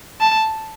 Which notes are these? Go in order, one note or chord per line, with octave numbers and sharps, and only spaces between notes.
A5